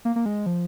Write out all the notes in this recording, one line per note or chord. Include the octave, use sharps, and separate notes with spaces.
A#3
A#3
G#3
F3